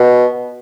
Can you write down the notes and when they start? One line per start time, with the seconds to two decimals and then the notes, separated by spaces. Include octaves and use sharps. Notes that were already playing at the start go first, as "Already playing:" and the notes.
Already playing: B2